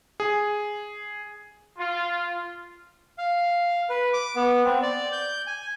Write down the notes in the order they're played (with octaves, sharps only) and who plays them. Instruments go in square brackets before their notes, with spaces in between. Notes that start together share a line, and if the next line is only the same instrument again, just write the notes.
[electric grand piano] G#4
[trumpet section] F4
[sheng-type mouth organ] F5
B4
D6
B3
C4
D5
G6
G#5